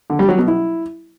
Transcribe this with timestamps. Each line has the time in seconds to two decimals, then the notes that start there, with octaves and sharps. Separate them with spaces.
0.10 D3
0.19 G3
0.29 F#3
0.38 B2
0.48 E4